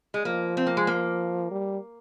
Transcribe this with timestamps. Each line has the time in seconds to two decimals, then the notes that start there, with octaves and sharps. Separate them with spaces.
0.14 G#3
0.25 F3 A#3
0.57 C4
0.67 A#3
0.77 G#3
0.87 A#3
1.51 G3